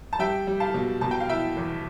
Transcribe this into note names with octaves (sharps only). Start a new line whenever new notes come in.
A5
G3 E5 G5
G3
F5 A5
B2
B2 A5
G5
F5
E4 E5 G5
E2